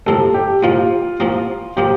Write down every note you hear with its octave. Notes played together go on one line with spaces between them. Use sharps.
C2 C3 F3 A#3 A4
G4
C2 C3 F3 A#3 F4
C2 C3 F3 A#3
C3 F3 A#3 G4